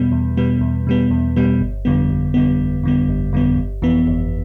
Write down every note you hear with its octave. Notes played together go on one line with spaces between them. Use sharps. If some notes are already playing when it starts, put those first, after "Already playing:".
Already playing: E2 B2 G3 B3
E2
B2 G3 B3
E2
B2 G3 B3
E2
B2 G3 B3
G1
F2 D3 G3 B3
G1
F2 D3 G3 B3
G1
F2 D3 G3 B3
G1
F2 D3 G3 B3
G1
F2 E3 B3
G1